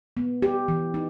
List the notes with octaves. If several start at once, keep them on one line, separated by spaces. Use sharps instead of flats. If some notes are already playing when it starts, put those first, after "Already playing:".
B3
G4
E3
D#4